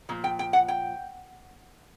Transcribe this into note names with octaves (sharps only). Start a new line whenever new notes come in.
A#2 F3
G5
G5
F#5
G5